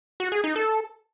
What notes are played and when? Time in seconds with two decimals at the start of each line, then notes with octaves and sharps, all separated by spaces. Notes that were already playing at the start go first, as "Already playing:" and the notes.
0.20 F#4
0.32 G#4
0.44 D#4
0.56 A4